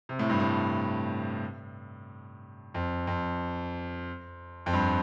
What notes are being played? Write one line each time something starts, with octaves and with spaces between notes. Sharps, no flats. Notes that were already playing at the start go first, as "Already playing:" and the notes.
C3
A2
G2
A2
F2
F2
F2
G2